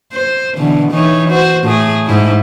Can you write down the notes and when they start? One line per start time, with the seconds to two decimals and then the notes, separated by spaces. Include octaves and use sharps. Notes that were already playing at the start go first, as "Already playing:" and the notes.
0.13 C5
0.58 B2 D3 E3
0.91 E3 D#4 C#5
1.29 F#4 C5
1.64 A2 A3 G#4
2.06 G#2 E4